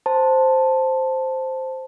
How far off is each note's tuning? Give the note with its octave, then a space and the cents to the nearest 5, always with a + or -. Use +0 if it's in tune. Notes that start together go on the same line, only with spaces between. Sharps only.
C5 +0 A5 +0